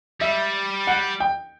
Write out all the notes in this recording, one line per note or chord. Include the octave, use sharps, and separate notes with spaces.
G3 E5
F#5
G5